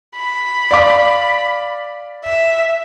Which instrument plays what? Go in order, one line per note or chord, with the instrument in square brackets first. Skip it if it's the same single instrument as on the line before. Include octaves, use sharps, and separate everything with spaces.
[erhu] B5
[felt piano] D5 F5 D6
[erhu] E5